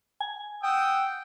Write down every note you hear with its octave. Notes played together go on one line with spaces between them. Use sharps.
G#5
F#5 G5 D#6 E6